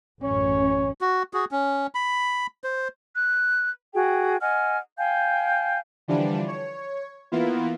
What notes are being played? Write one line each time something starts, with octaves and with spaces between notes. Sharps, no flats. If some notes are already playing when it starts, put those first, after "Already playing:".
A1 F#2 C#4 C#5
F#4
F#4 G#4
C#4
B5
C5
F#6
F#4 G#4 G5
D#5 F#5 G#5 F6
F5 G5 G#5 G6
D3 E3 F3 G3 D4
C#5
E3 A#3 B3 E4 F4